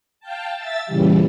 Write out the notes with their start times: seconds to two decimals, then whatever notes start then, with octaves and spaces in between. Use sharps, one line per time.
0.20 F5 G5 A5
0.56 E5 E6 A6
0.87 A#2 C#3 E3 G3